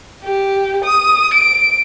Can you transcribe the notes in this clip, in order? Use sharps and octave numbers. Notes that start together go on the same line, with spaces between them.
G4
D#6
D7